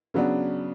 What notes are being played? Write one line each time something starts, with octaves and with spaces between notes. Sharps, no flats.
C#3 F#3 B3 D4